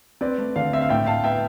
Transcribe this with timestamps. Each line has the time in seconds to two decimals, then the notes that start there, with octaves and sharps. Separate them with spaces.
0.21 C4 B4 D5
0.38 A3
0.56 D3 D5 F5
0.73 C4 E5
0.81 F5
0.89 A2 E5 G5
1.06 A2 F5 A5
1.24 B3 E5 G5